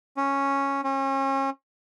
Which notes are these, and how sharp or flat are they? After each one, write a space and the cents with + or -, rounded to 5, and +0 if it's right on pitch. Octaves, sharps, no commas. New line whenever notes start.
C#4 -5
C#4 -35